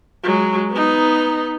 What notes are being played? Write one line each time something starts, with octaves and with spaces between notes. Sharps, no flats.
F#3 G#3
B3 D#4